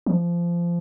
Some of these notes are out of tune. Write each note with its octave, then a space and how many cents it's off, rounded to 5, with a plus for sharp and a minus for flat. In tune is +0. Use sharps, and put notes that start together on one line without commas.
F3 -20